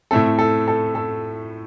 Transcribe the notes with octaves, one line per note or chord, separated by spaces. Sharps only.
A2 A3 C4 A4
A4
A4
A4